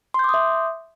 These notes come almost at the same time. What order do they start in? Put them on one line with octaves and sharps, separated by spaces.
C6 G6 D6 D#6 E5